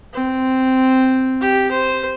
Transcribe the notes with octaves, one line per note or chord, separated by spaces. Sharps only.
C4
G4
C5